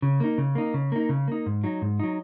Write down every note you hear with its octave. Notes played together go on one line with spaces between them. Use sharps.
C#3
A#3 D#4
C#3
A#3 D#4
C#3
A#3 D#4
C#3
A#3 D#4
G#2
F#3 D#4
G#2
F#3 D#4